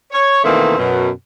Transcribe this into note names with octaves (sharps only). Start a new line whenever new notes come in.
C#5
B2 D#3 E3 A3 A#3 C4
F#2 B2